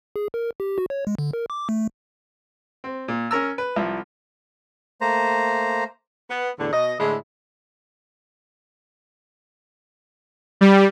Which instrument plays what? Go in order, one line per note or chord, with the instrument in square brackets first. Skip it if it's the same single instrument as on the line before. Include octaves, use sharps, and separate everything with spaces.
[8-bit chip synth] G#4
A#4
G4
F#4
C#5
G#3
D3
A#4
D6
A3
[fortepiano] C4
A#2
C#4 A#4 A#5 E6
B4
C2 F3 E4
[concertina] A3 A#3 C5 A#5
[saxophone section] B3
E2 A2 D3
B2 D#5
A2 D3 G#3 E4 G#4
[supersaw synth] G3